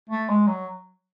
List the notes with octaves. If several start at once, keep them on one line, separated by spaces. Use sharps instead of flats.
A3
G#3
F#3